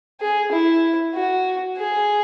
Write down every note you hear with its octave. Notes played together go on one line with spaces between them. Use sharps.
G#4
E4
F#4
G#4